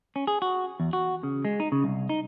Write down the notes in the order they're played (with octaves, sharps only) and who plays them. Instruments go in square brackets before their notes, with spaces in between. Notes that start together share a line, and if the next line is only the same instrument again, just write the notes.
[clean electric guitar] C#4
G#4
F#4
E2
F#4
C#3
G#3
D#4
C#3
C2
D#4